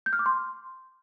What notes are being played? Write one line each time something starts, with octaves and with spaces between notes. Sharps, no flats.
G6
F6
D6
C6